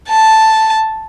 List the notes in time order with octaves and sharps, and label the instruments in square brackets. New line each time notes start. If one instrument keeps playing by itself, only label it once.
[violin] A5